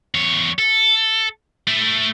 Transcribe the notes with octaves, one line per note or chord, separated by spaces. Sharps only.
E2 C#5
A4
A3 E4